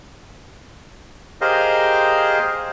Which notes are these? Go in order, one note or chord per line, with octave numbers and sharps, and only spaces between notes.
G4 G#4 A#4 C5 D#5 F5